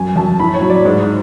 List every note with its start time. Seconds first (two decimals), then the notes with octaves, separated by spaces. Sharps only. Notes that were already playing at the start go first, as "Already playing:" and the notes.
Already playing: F#2 G#5
0.16 F#2 A5
0.40 A2 B5
0.54 C#5
0.62 F#3
0.70 D5
0.85 G#2